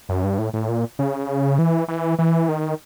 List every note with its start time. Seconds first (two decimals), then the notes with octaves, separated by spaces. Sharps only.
0.09 F#2
0.24 G2
0.39 A2
0.54 A2
0.69 A#2
0.99 C#3
1.59 E3
1.88 E3
2.19 E3
2.49 D#3